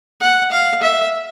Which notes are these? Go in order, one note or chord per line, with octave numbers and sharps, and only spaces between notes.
F#5
F5
E5